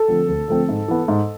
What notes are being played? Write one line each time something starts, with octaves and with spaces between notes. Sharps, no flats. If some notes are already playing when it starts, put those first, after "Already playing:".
Already playing: A4
D3 F3 A3 C4
D2
D3 F3 A3 C4
G#2
E3 B3
G#2